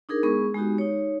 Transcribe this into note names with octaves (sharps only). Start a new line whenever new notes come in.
D4 D#4 G#4 A#4
G#3 B3 G#4 C#6
G#3 B3 D#4 F#4 G4
D#4 C#5